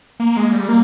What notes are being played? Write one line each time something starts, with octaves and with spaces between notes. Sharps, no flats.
A#3
G#3
G3
A#3